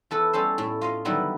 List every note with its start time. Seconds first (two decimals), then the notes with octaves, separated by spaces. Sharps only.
0.11 E2 A4 B4
0.33 G3 C#4 A4 C5
0.58 A2
0.81 F4 D#5 F5
1.05 D3 D#3 F#3 G3 B3 E4